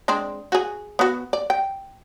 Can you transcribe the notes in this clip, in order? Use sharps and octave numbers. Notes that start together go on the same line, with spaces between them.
G#3 C4 D4
F#4 G#4
B3 F#4
D5
G5